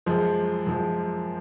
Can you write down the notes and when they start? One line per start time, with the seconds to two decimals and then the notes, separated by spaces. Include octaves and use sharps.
0.06 F#2 F3 G#3
0.67 F#2 F3 G#3